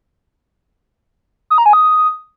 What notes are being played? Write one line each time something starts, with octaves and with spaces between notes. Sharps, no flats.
D#6
A#5
G#5
D#6